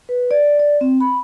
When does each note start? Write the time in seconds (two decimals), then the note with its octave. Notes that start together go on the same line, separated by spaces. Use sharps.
0.09 B4
0.31 D5
0.59 D5
0.81 C4
1.00 B5